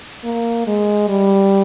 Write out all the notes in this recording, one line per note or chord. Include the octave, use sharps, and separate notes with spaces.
A#3
G#3
G3